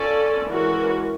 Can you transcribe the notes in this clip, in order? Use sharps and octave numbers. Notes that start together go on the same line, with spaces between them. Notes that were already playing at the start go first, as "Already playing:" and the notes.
Already playing: C#4 F4 A4 D5
E3 G#3 C#4 F#4 A#4